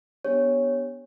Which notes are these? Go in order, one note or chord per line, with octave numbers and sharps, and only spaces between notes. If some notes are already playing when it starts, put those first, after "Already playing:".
B3 D4 G4 C#5